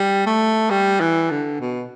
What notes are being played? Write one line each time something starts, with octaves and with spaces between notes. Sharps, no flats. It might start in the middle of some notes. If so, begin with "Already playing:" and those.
Already playing: G3
A3
G3
E3
D3
B2